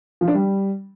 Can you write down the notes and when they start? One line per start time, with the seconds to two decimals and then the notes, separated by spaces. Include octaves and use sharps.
0.21 F3
0.28 D4
0.34 G3